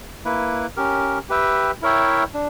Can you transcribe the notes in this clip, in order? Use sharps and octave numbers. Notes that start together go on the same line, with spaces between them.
A#3 E4 B4
C#4 G4 A#4
G4 B4 E5 G5
E4 A#4 C#5 E5 G5
D4